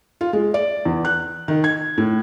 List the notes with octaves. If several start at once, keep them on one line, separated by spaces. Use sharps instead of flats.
F4
G#3
D5
E2
F#6
D#3
G#6
A2